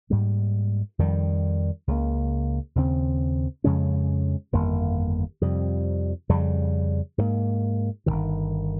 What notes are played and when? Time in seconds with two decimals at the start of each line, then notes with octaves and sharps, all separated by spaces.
0.10 G#2 G3 A#3
0.99 F2 D#3 G3
1.87 C#2 C#3 G3 A#3
2.75 D#2 C#3 G#3 C4
3.64 F2 C#3 G#3 C#4
4.52 G1 F2 D#3 A#3
5.41 F2 C3 G3
6.29 F2 C#3 G3
7.18 G#2 F3 A#3
8.06 G1 F2 D#3